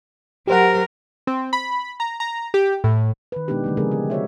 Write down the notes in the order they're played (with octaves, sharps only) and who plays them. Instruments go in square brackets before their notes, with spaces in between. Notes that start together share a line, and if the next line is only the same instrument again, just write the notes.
[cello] F#3 A#4 [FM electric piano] G4 C5 F#5
[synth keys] C4
B5
A#5
A#5
G4
A2
[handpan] D#3 B4
B2 G#3 B3 D4 D#4 G4
D3 G3 A3
C#3 F3 G#3 C4 G#4 A#4
G4
F#4 C5 C#5 E5